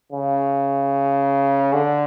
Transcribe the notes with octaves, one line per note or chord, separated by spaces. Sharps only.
C#3
D3